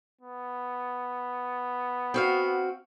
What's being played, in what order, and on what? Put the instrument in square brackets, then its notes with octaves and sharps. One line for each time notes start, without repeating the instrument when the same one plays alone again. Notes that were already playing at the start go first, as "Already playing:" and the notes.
[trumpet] B3
[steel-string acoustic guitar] C4 F#4 F5